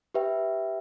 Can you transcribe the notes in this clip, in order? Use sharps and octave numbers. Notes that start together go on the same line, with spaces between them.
G4 B4 E5 G5